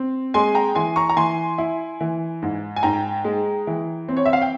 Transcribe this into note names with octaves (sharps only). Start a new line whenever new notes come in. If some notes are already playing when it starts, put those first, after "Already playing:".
Already playing: C4
G#3 G#5 C6
G5 A#5
E3 G#5 C6
A#5 C#6
A#5
E3 G#5 C6
E4
E3
G#2
G#5
G#2 G5 A#5
G#3
E3
C4
C#5
E5
F5
G5